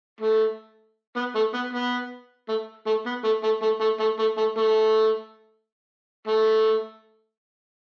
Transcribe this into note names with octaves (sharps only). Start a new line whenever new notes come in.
A3
B3
A3
B3
B3
A3
A3
B3
A3
A3
A3
A3
A3
A3
A3
A3
A3